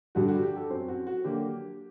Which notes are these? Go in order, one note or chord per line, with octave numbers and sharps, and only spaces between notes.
G2 D3 G3 F#4
F#4
G4
A4
F#2 F#3 C4
F#4
F#4
D3 F#3 A#3 G4